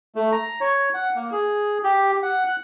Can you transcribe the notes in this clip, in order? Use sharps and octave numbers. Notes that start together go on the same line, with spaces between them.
A3
A#5
C#5
F#5
A#3
G#4
G4
F#5
F#6